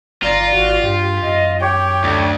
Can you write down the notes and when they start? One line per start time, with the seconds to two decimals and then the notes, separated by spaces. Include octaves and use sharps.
0.23 G1 F4 D5 A#5
0.54 G#1 F#4 D5
0.83 G2 G4
1.23 F#2 D#5
1.62 G4 C#5 G5
2.04 D2